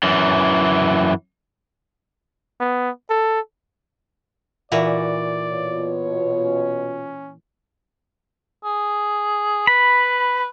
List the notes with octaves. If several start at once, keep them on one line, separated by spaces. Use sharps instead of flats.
F#2 E3
B3
A4
A#2 E3 F#4 D5
B2 F4 C#5
C#4
G#4
B4 B5